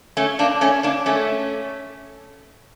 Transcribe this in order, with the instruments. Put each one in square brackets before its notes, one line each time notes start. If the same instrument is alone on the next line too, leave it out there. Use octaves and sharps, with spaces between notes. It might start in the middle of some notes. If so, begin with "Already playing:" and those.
[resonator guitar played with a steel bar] A3 C#4
A#3 D4
A3 C#4
A#3 D4
A3 C#4